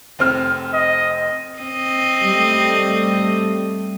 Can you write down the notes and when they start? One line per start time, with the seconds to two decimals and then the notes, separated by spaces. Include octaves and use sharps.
0.19 F1 C4 F6
0.73 D#5
1.59 C4 D#5
2.24 G3 A3